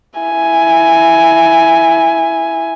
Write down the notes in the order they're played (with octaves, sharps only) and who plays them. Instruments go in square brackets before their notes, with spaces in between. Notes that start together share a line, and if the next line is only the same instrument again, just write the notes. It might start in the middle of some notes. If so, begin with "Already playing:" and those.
[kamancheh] E4 G#5